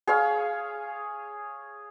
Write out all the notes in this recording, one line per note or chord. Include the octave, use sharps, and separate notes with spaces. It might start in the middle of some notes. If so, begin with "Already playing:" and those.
G#4 C#5 F5